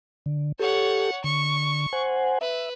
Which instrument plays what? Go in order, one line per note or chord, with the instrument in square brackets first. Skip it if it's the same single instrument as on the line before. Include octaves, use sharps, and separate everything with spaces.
[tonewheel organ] D3
[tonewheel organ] G4 A4 [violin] C#5 F#5
[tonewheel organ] D3 [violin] C#6
[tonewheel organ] C5 F#5 G#5
[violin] B4 [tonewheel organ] E5